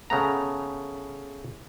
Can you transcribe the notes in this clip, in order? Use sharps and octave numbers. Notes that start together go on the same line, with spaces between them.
C#3 A3 B3 A#5